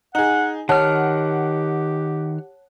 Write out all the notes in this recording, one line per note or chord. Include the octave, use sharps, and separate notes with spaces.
D#4 G#4 F#5
D#3 G4 C#5 F#5 A5 F6